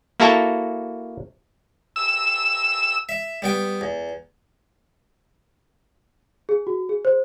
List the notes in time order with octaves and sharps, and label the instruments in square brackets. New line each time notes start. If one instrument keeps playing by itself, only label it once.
[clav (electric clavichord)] A#3 E4 F#4 A4 A5 A#5
[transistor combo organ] E6
[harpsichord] E5
G3 B3 G5
E2
[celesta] G#4
F#4
G#4
C5